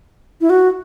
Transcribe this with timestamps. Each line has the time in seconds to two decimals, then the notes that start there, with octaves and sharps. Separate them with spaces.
0.41 E4
0.50 F#4